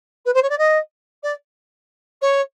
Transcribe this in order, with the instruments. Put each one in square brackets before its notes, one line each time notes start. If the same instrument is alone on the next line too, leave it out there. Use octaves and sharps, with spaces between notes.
[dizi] B4
C5
C#5
D5
D#5
D5
C#5